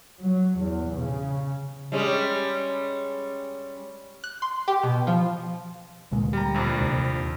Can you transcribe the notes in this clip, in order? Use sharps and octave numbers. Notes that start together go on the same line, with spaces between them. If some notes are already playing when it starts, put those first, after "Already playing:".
F#3
E2
C#3
G3 G#3 C#4
F#6
C6
G4
B2
F3
D2 A#2 G#3
G3 A#5
A#1 F2
D#2 C3